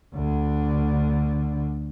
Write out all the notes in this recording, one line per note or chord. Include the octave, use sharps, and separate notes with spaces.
D2 D3